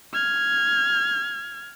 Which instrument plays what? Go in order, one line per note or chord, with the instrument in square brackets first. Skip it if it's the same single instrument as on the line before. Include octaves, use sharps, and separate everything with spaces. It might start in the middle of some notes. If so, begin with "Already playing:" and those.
[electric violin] F6 G#6